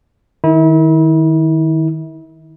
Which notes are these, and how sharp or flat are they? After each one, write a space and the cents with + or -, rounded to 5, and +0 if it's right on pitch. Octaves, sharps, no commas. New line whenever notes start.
D#3 +0 E4 -35